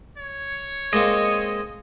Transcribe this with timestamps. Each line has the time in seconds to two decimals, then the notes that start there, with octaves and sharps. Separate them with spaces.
0.18 C#5
0.93 G#3 A#3 C4 D#5